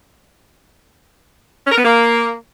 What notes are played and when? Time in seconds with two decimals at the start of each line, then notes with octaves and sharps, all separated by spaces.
1.66 C#4
1.72 A#4
1.78 B3
1.84 A#3